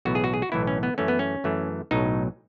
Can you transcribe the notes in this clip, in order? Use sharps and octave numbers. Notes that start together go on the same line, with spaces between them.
B1 A2 E3 B3 F#4
G#4
F#4
G#4
F#4
B1 A2 E3 B3 E4
C#4
B3
F#2 E3 A3 C#4
B3
C#4
F#2 E3 A3
B1 A2 F#3 D#4